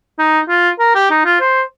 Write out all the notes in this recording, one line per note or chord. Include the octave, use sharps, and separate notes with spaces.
D#4
F4
A#4
G4
D#4
F4
C5